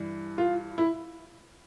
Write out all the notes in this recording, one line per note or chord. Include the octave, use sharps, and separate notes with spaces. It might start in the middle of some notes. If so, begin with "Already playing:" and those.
Already playing: G2 E3
F4
E4